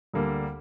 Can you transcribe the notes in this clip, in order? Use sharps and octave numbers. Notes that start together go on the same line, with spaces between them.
D2 D3 G3 A#3